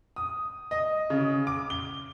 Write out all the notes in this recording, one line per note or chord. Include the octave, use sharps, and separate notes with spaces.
D#6
D#5
C#3
D6
G7